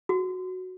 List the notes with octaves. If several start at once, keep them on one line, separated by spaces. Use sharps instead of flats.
F#4